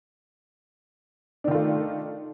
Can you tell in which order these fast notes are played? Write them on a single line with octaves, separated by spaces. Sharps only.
D4 D#3 F4 A3